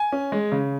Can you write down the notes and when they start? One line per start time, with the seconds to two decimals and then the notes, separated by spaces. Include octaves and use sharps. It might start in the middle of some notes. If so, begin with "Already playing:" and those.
Already playing: G#5
0.12 C#4
0.32 G#3
0.52 C#3